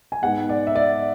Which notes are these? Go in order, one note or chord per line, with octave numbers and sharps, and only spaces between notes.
G#5
G#2 G#3 B3 F#5
D5
E5
D5